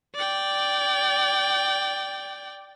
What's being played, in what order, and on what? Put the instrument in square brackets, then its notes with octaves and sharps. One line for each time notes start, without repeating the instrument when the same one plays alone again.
[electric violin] D5 G5